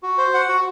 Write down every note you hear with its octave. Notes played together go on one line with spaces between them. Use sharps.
F#4
C5
F#5
F#4